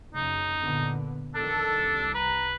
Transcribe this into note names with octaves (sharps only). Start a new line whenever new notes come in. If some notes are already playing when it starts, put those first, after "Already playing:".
F#1 C#3 D#4
A#2 D3 B3
F2 D#3 D4 A4
C2
B4 A#5